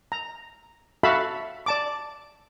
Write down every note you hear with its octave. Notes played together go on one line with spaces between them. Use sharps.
A#5
F#4 A4 E5 F5 A5 B5
D5 A5 D6